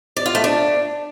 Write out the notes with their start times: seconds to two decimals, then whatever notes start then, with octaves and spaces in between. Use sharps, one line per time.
0.17 D5
0.26 F4
0.35 A3
0.44 D4